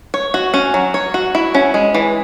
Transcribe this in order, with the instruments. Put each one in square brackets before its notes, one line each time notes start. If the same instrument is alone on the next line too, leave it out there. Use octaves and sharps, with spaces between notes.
[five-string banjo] C#5
F#4
C#4
F#3
C#5
F#4
E4
C#4
G#3
E3